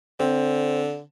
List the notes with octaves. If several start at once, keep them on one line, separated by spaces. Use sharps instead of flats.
D3 C4